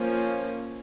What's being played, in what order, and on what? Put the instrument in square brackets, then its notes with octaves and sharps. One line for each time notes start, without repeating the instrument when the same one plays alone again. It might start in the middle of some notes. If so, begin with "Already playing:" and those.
Already playing: [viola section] F3 A#3 C#4